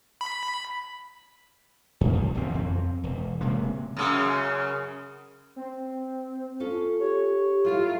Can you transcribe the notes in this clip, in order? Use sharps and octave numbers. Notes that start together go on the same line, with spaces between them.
B5
E2 B2
C2
F#1 E2 B2 C4
F2 C4
E1
D1 C3 G#3 A#3
F#2 C#3
C4
C#4 F4 A4
G4 C#5
F#3 G#3 A3 E4 F4